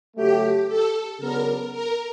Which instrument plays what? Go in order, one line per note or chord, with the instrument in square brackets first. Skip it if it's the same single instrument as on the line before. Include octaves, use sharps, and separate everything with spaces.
[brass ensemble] C#3 F#3 A3 [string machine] G4
[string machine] A4
[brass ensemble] C#3 F#3 B3 D4 [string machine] A#4
[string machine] A#4